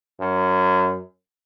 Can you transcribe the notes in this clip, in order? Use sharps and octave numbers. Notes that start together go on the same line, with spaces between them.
F#2